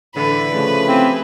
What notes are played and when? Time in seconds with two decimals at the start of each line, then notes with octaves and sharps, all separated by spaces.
0.16 A2 D3 E3 B4
0.53 C#3 F3 A3
0.88 C4 E4 G4 G#4